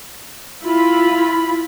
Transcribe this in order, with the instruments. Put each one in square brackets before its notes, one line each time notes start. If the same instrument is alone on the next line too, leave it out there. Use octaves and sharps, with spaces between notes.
[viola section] E4 F4 B5